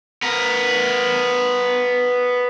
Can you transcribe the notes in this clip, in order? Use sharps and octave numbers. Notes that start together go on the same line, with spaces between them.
B3 A#4